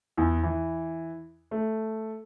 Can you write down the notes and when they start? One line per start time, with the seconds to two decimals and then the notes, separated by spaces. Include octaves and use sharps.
0.17 E2
0.43 E3
1.51 A3